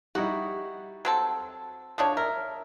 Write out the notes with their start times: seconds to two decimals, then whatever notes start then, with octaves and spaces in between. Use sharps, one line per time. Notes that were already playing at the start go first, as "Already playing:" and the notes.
0.15 G3 D#4 E4 F#4
1.05 F#3 C4 A4
1.98 D3 F3 D4 C#5 D#6
2.17 A#4 E5